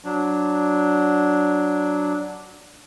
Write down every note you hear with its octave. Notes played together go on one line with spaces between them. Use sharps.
F#3 D4